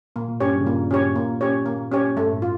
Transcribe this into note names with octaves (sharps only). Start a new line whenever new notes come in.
A#2 A#3
A#2
G2 C#4 G4 C#5
G2
C#3
A#2 A#3
C#4 G4 C#5
A#3
C#4 G4 C#5
A#3
C#4 G4 C#5
G2 A3
A2
F4